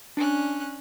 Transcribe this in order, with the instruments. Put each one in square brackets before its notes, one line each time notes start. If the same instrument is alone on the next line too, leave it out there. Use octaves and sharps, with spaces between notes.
[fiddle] C#4 F#6 [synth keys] D4